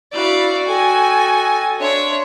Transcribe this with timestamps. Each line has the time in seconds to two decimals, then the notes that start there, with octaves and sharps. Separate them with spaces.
0.13 D4 E4 F#4 D5 F5 B5
0.67 A4 D#5 G5 G#5
1.79 D4 C#5 E5 F5 C6